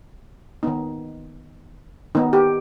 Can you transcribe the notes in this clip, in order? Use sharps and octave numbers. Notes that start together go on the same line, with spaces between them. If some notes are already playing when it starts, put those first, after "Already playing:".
D#3 B3 D#4
D#3 B3 D#4
G4